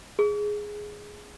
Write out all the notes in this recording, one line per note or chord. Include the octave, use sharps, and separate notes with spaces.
G#4